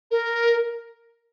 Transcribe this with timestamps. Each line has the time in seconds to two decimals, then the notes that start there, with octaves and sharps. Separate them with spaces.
0.11 A#4